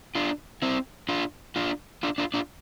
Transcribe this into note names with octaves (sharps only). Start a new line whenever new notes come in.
D4 F4
C4 E4
D4 F4
D4 F4
D4 F4
D4 F4
D4 F4